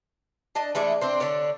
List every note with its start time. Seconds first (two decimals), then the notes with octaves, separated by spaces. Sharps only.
0.55 D4 D5 D#5 A5
0.75 E3 G#3 A3 D5
1.01 C4 D4 C5
1.20 D3 D4 C#5 D5